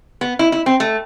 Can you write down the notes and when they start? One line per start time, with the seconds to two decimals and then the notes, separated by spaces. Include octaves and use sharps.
0.21 B3
0.39 E4
0.52 E4
0.66 C4
0.80 A3